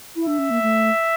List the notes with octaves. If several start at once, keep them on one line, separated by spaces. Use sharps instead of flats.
E4
D4 E5
C#4
A#3
A3